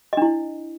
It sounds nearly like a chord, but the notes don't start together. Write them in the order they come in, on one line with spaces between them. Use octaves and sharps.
D#5 D4 E4